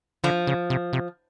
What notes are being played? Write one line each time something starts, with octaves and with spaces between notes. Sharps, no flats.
D3 F3
C#3
C3
C3